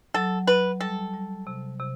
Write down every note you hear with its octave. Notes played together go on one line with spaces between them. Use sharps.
F#3 A4
F#3 B4
G3 A4
G3
C3
C3